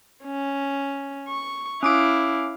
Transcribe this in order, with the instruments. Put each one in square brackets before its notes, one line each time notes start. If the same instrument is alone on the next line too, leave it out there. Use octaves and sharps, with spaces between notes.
[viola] C#4
C#6
[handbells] C#4 D6 D7 [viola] E4 F5